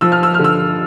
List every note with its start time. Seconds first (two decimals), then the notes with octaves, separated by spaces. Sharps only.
0.01 F3 E6
0.12 F6
0.23 E6
0.34 D3 F6
0.44 E6